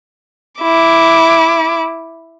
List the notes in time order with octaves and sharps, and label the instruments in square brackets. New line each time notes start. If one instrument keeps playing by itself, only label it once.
[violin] E4 D6